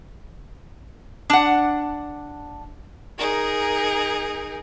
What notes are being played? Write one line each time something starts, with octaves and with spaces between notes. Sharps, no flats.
D4 F#5
D#4 G#4 A#4